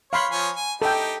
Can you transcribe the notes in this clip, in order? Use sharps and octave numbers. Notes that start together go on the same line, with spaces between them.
C#5 F5 B5 C6
F3 C#5 G#5
G#5
D#4 G4 A4 G5